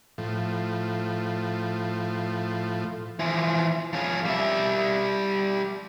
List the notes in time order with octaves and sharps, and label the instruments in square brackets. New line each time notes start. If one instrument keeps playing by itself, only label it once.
[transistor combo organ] A2 F3
[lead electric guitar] E3 F3
F3 C#4
G3 E5